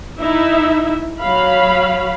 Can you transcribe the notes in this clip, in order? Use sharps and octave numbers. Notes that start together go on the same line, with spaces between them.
D#4 E4 E5
F#3 F5 B5